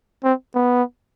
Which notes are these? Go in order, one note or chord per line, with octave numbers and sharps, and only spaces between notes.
C4
B3